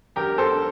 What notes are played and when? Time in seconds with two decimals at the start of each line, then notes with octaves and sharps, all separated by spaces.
0.16 E1 G4 A#4
0.38 A4 C5